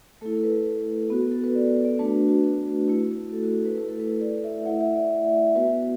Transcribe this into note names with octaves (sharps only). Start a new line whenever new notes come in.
A3 E4 A4
A4
B4
B3 F#4
A4
B4
D5
D5
A3 D4 F#4 B4
F#4
A3 E4
A4
F#4
A4
B4
A3 E4 B4
A4
B4
D5
E5
A3 E4 F#5
E5
D5
E5
E5
B3 F#4 B4